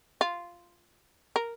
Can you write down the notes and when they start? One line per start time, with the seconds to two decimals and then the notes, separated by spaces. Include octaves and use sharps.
0.21 F4
1.36 A#4